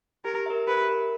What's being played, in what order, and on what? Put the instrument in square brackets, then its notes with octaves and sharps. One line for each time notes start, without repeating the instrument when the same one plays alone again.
[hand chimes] G4 [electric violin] A#4
[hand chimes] A#4 E5
[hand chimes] G4 [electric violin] B4
[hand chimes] A#4 E5